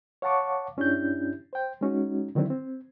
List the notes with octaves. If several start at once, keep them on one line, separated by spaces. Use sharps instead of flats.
C#5 F5 F#5 A5 C#6 D6
G2 C#4 D4 E4 G4 G6
C5 G5
G#3 C#4 D#4 F#4
D3 D#3 F#3 C4 D4 E4
C4